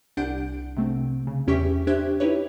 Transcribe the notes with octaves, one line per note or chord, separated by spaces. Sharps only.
C2 D4 F#5 G6 D7
C3 A3 C4
C#3
E2 C#4 G4 E5 C#6 B6
D4 G4 C5 E5 F#6 G#6
D#4 E4 G4 B4 C#5